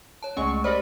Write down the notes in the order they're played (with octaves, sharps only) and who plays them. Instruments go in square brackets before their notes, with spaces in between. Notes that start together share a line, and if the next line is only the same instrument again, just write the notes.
[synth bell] C#5 A5
[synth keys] C#2 G#3 C#6 [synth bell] A3 C#4
[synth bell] G4 A#4 C5 [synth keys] D5 D#5 B5